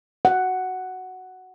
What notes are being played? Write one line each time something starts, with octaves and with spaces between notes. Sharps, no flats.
F#5